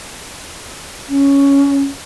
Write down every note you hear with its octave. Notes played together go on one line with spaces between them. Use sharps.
C#4